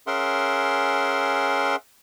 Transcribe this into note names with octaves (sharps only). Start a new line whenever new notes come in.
C#4 G#4 A#4 E5 F#5 C6